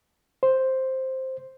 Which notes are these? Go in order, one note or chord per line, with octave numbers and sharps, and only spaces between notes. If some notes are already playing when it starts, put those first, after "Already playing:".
C5